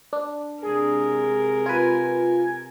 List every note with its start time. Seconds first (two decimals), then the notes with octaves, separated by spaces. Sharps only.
0.13 D4
0.62 C3 G#3 G#4 A#4
1.66 F4 B4 G#5